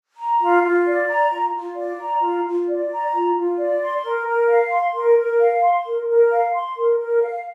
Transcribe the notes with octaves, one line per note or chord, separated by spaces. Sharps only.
A#5
F4
F4
D5
A#5
F4
F4
D5
A#5
F4
F4
D5
A#5
F4
F4
D5
C6
A#4
A#4
F5
C6
A#4
A#4
F5
C6
A#4
A#4
F5
C6
A#4
A#4
F5